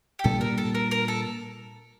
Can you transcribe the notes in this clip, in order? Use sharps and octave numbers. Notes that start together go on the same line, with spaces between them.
G4
A#2 G3 D4 A4
A#4
A4
A#4
A#4
A4